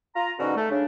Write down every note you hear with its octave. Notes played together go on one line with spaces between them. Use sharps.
F4 A#5
G#2 B2 D3 C#4 D#4 F#4
A3
C#3 D4